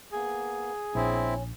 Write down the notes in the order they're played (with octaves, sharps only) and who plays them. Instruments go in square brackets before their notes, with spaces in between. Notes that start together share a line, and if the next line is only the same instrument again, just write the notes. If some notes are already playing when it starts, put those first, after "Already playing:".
[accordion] A#3 B3 [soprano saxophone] G#4
[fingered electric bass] A#1 [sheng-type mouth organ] C4 E4 [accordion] C#4